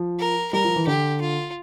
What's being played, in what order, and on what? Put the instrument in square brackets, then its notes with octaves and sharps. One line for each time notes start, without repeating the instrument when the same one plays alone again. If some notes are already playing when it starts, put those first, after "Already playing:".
Already playing: [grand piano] F3
[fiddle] A#4
[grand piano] G3 [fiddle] A#4
[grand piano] F3
E3
[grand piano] D3 [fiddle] G4
[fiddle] F4